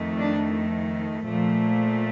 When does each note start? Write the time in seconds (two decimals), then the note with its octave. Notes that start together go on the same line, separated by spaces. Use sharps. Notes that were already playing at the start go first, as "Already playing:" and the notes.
Already playing: F2 D#3 A3
0.18 D4
1.27 A#2 F3 A3